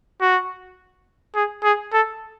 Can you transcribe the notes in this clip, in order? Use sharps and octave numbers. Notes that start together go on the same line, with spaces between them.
F#4
G#4
G#4
A4